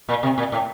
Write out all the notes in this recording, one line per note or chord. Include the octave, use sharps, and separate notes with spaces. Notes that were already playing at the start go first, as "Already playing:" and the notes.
A#2
C3
A#2
A2